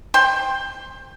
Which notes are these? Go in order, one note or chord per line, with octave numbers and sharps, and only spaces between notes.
C5 G5 C6